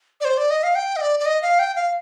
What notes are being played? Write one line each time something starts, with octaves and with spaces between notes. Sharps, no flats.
D5
C5
D5
D#5
F5
G5
D#5
D5
D5
D#5
F5
G5
F5